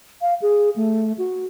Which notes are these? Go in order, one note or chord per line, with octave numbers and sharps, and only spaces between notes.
F5
G#4
A3
F#4